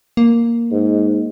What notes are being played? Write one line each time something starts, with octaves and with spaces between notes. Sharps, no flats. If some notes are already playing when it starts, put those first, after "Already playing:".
A#3
G#2